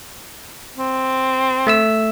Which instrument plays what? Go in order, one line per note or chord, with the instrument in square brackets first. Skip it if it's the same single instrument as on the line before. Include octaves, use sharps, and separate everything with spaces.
[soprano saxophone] C4
[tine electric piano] A3 E5 E6